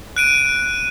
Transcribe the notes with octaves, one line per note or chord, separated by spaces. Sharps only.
F#6 D7 D#7